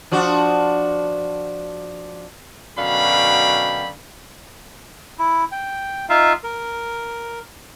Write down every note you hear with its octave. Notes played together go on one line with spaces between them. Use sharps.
F3 D4 F#4
F#2 B2 D3 F5 G5 B5
E4
G5
D#4 F4 E5 F5
A#4